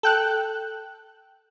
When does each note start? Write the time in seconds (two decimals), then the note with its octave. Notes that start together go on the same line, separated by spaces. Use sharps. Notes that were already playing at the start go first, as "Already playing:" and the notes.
0.03 A4 G5 F#6